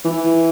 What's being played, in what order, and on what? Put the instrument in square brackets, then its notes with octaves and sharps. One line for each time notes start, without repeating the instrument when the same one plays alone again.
[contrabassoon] E3